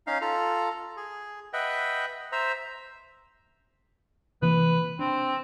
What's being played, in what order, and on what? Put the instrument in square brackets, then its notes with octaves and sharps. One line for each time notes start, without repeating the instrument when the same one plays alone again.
[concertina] C#4 D#4 F5
F4 A4 A#5
G#4
B4 D#5 E5 F#5 G5
C5 E5 A#5
[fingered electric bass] C3 E3 A#3 [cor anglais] B4
[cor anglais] C4 [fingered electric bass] D4